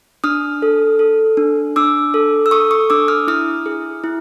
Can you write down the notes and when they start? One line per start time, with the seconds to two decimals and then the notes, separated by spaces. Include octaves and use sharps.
0.24 D4 D#6 F6
0.62 A4
0.99 A4
1.37 D4
1.76 D4 D6 E6
2.14 A4
2.46 E6
2.51 A4 C#6 D#6
2.71 C#6 D#6
2.90 D4 D6 E6
3.08 D#6 F6
3.28 E4 D#6 F6
3.66 G#4
4.04 E4